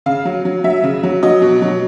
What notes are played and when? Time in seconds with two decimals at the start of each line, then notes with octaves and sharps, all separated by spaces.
0.06 C#3 F5
0.25 F#3
0.45 F#3
0.64 F#3 E5
0.83 C#3
1.03 F#3
1.23 F#3 D#5
1.42 B2
1.62 F#3